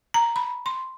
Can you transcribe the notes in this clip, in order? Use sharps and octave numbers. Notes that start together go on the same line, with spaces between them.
A#5
B5
C6